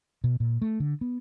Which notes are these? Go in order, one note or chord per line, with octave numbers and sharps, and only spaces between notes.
B2
A#2
A3
D3
B3